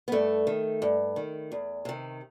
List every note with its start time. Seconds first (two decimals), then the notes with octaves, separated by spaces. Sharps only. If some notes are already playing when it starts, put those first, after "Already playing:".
0.08 B3
0.12 G2 A3
0.47 D#3
0.82 G2
1.16 D#3
1.52 E2
1.85 C3 D#3